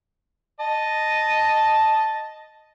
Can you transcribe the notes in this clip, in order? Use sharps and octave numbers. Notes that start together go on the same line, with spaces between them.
D#5 A5